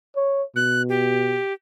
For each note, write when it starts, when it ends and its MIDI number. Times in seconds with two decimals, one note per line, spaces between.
0.16 0.43 73
0.56 1.39 47
0.56 0.82 90
0.89 1.53 67